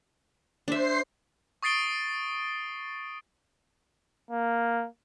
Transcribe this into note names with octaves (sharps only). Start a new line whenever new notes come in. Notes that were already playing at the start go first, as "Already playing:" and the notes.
D4 C5 E5 C7
C#6 D#6 A6 C7 D7 G7
A#3